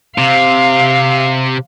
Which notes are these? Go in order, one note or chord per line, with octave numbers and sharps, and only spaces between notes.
C3 F5